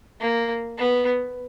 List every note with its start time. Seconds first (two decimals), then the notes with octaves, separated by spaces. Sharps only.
0.21 A#3
0.78 B3